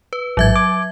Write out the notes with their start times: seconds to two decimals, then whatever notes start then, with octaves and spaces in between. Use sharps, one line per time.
0.13 B4
0.37 A1 G#2 F#3 E5 G#6
0.56 D6